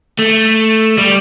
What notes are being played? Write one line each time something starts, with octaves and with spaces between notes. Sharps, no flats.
A3
G3